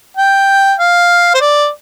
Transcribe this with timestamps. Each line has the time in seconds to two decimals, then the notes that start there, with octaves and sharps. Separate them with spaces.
0.17 G5
0.79 F5
1.34 C5
1.41 D5